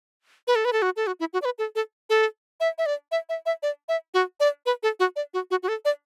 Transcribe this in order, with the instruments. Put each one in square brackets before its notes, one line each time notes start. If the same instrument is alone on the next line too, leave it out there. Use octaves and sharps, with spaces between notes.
[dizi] B4
A4
B4
A4
F#4
A4
F#4
E4
F#4
D5
B4
A4
A4
A4
E5
E5
D5
E5
E5
E5
D5
E5
F#4
D5
B4
A4
F#4
D5
F#4
F#4
F#4
A4
D5